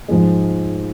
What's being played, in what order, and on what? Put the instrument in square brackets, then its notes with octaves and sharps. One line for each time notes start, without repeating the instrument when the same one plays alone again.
[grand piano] G#2 F3 G#3